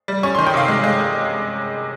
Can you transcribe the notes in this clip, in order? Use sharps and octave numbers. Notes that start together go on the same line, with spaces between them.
G3
C#4 C#6
C6
D#3
G5
C3 F5
G#3
G#3